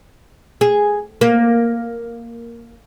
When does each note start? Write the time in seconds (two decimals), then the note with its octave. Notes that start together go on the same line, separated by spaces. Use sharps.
0.61 G#4
1.21 A#3